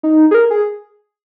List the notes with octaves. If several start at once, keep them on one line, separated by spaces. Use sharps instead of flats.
D#4
G#4
A#4
G#4